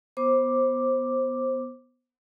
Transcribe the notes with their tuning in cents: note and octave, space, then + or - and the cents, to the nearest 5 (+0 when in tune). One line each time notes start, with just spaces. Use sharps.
B3 +0 C5 +15 D6 +0